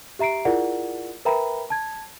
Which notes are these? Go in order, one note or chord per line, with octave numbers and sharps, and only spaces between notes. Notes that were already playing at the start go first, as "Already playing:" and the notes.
G4 E5 A#5 C7 D7
E4 F4 G#4 A#4 D5 F#5
A#4 B4 E5 G5 A#5 B5
A5 G#6